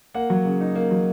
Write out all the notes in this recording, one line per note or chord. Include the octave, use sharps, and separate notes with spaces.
A#3 F#5
F#3
C#3
D#4
A#3
F#3